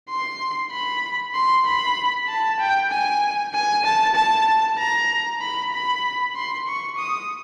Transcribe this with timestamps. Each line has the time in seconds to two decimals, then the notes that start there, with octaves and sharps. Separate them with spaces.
0.10 C6
0.71 B5
1.34 C6
1.65 B5
2.28 A5
2.60 G5
2.90 G#5
3.54 G#5
3.85 A5
4.16 A5
4.78 A#5
5.41 B5
5.73 B5
6.36 C6
6.67 C#6
6.98 D#6